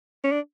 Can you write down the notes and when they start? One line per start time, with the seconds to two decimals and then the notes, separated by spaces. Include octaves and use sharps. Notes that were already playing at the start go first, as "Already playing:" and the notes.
0.24 C#4
0.32 D4